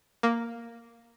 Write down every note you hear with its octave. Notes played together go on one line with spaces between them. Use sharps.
A#3